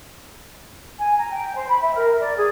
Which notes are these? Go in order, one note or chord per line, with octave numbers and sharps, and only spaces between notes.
G#5
A#5
G5
C5
B5
E5
A#4
D5
G#4